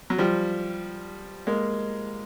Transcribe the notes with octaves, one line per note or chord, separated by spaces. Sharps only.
F#3
F3 G3
G#3 A#3